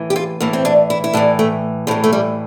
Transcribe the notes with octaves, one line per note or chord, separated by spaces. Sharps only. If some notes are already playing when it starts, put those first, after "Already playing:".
Already playing: A2 E3
G4
F4
A2 E3 A#3
C4
D4
E4
E4
A2 E3 D4
A3
A2 E3 F3
A3
G3